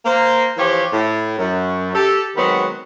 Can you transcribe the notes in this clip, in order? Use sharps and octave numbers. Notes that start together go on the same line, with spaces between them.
A#3 C5
E3 F3 F4 G4 C#5
A2
F#2
G4 A4
D#3 F#3 G#3 B3 C4